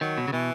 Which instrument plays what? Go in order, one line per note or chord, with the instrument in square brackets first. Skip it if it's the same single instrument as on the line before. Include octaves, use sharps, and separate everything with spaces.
[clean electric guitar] D#3 [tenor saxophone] F#3
[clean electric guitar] B2
C#3
[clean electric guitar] B2 [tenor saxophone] E3